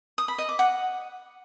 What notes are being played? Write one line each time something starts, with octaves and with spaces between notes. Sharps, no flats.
D#6
B5
D#5
D6
F#5